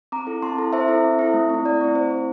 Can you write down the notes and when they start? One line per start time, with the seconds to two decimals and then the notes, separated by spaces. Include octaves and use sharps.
0.12 C4 A#5 D6
0.27 E4 A4
0.42 C4 A5 C6
0.58 E4 A4
0.73 C4 C5 E5
0.88 E4 A4
1.04 C4
1.19 E4 A4
1.34 A3
1.50 C4 E4
1.65 A3 D5
1.81 C4 E4
1.95 A3 C5
2.10 C4 E4